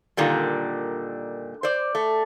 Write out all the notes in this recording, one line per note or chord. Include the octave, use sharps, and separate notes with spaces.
A#2 D3 D#3 G3
C5 D5
A3